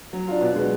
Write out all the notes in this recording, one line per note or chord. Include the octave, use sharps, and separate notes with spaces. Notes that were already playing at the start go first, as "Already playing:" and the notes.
F#3
D4 F4
B2
G#3 B3